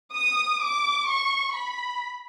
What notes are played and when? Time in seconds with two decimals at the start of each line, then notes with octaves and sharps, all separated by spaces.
0.14 D#6
0.62 D6
1.09 C#6
1.56 B5